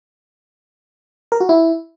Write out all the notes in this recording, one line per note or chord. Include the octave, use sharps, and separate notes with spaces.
A#4
F#4
E4